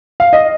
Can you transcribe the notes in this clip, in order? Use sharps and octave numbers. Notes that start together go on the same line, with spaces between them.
F5
D#5